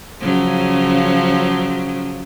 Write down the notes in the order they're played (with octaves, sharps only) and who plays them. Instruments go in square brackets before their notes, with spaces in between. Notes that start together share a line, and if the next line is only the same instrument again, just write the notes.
[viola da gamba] C#3 F3 F#3